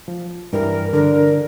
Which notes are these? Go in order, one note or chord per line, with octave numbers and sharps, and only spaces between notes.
F3
G2 E3 G3 A#4
D3 D4 A#4